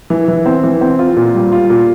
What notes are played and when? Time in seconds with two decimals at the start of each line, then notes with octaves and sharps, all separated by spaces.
0.10 E3
0.28 E3
0.46 C4
0.64 E3
0.81 C4
0.99 F4
1.16 A#2
1.35 G3
1.52 F4
1.70 A#2